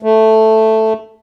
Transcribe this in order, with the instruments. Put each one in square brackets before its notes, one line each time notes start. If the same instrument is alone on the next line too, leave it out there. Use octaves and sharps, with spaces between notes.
[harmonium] A3